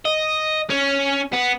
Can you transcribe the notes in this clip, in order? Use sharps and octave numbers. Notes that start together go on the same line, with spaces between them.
D#5
C#4
B3